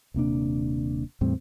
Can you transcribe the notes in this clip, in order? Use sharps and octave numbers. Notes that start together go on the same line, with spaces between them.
D#1 C3 A#3 D4
E2 A2 G3 C4